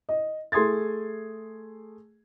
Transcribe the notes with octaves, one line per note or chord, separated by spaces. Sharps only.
D#5
A3 G#4 C6 D#6 G#6 A6